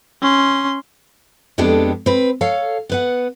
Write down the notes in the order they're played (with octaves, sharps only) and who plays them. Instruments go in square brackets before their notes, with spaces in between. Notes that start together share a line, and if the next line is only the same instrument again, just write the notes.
[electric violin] C#4 C6
[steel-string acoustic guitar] F2 G#3 B3 D4 G4 A4
C4 B4
A4 C#5 F5
B3 B4 F#5